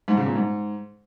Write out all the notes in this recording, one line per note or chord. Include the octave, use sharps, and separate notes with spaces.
G#2
C#3
A#2
G#2